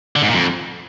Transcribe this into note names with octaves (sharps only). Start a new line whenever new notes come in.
D3
G#2
A#2
F2